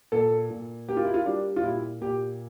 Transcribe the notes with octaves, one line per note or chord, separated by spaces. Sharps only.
A#2 A4
A#2
A#3 G4
F4
E4
F4
G3 D4
F4
A#2 E4
A#2 G4